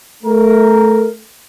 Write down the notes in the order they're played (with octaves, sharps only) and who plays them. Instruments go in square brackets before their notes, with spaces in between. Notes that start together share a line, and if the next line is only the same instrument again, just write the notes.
[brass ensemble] A3 A#4